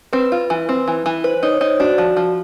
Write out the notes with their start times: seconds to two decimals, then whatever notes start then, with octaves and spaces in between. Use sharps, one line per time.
0.13 C4 B4
0.32 F4
0.50 E3
0.69 C4
0.88 E3
1.06 E3
1.24 B4 C5
1.43 D#4 C#5
1.61 D#4 C5
1.80 D4 F#4
1.98 F3
2.17 F3